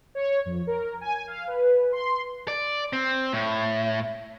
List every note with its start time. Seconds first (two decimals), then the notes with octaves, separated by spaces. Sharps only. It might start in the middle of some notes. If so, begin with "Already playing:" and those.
0.15 C#5
0.45 F2
0.67 A#4
1.01 G#5
1.27 F5
1.47 B4
1.92 C6
2.48 D5
2.93 C4
3.33 A2